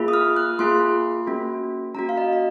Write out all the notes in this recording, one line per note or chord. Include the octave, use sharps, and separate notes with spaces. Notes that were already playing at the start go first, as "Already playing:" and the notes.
Already playing: A#3 F4 G#4
D#6
F6
F#6
A#3 F4 G#4 C6
A#3 C#4 F#4
A#3 C#4 F#4 A#5
F5
D#5
D#5